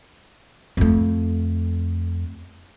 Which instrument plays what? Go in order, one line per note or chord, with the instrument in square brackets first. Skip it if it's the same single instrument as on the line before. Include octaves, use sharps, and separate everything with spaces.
[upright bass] F2 A3